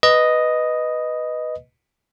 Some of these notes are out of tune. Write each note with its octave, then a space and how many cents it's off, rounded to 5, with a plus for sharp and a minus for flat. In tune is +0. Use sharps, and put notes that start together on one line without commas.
B4 +0 D#5 +0